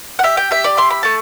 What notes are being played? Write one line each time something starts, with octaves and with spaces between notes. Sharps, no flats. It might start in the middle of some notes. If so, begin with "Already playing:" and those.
F#5
G4 E5
G5
G4 E5
D5
E4 C6
B5
A3 A5